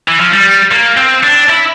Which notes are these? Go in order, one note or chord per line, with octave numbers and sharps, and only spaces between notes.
E3
F3
G3
A#3
C4
D4
E4